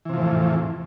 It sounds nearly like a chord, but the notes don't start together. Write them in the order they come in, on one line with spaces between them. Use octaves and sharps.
E3 C3 F3 A2 E2